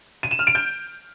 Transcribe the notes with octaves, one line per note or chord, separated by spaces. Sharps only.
D#7
E7
F6
D7
G6